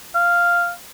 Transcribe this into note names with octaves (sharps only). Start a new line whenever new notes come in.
F5